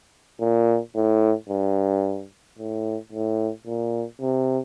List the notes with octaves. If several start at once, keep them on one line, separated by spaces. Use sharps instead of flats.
A#2
A2
G2
A2
A2
A#2
C3